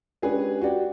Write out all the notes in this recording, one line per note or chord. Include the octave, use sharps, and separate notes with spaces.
G#3 C#4 D4 G4 G#4 B4
F#4 G4 D5 G5